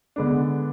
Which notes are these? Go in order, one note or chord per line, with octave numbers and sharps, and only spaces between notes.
D3 G#3 B3 D4